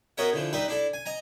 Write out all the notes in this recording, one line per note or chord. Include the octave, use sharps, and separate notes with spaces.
B3 F#4 A#4 C#5 D#5 E5
D3 E3 F3
G3 D#4 B4 E5 C6
D4 E4 A4
G#5
D#5 G#5 A#5